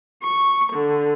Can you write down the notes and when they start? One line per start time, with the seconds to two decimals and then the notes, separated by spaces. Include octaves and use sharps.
0.23 C#6
0.73 D3